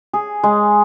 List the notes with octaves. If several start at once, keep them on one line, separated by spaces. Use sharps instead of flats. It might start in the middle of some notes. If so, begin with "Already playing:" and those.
G#4
G#3